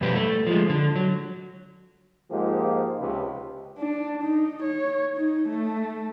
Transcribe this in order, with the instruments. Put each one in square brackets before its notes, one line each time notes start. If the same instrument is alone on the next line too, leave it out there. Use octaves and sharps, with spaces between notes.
[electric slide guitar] F2 B2 G3 G4 B4
A3
F3 G#3
D3
F#3
[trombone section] G#2 F3 G#3 A#3 F4 G4
C#2 C3 B4
[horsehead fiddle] D4
D#4
C#5
D#4
A3